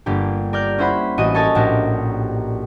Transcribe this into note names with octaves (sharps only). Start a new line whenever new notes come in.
G1 A#3 G4
A#4 D5 F6 G6
C#4 E4 C5 F#5 B5
A1 F#4 D#5 D#7
A4 A#4 C#5 G#5 A5 D#6
A#1 A2 F#4 G4 A#4